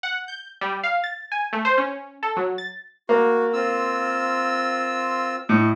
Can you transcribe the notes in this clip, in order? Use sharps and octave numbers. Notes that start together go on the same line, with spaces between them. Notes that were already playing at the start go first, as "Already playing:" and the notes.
F#5
G6
G3
F5
A6
G#5
A3
C5
C#4
A4
F#3
A6
A#3 F#4
C4 F4 E6
A2 D#5